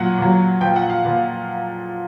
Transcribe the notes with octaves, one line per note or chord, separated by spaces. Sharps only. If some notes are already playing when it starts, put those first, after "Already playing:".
Already playing: A#2 F#3 F#5
A#2 F#3
A#2 F3 G5
F#5
F5
A#2 F3